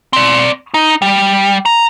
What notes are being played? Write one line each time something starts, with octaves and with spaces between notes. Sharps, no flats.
C4 D5
D#4
G3
A#5